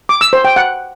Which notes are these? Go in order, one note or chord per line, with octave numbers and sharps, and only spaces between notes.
D6
E6
C5
G5
F#5